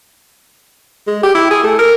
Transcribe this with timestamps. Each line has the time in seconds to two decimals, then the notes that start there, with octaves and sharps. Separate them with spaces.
1.07 G#3
1.23 G4
1.35 E4
1.51 G#4
1.63 A3
1.79 A#4